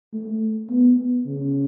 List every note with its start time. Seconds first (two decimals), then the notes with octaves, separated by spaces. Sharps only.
0.13 A3
0.70 B3
1.26 C#3